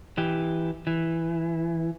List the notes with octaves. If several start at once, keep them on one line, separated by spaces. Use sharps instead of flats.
E3 G4
E3